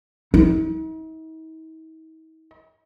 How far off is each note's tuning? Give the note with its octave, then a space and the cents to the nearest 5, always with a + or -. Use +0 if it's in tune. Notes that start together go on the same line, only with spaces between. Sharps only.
D#4 +45